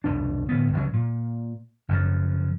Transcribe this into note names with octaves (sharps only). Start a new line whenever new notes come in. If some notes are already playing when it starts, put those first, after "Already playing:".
C2 F2 B2 D4
D1 D2 B3
C#2 C#3 F3 F#3
A#2
F#1 F#2 C3 F3